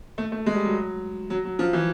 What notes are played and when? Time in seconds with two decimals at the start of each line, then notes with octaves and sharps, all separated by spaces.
0.18 A3
0.32 A3
0.46 G#3
0.55 G3
0.65 F#3
1.30 F#3
1.45 F#3
1.59 F3
1.73 E3